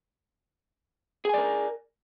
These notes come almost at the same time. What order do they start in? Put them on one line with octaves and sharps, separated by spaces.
G#4 G#5 D5 A#4